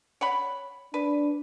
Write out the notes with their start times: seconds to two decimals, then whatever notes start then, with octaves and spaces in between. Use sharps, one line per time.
0.21 C#5 F#5 B5
0.94 D4 B4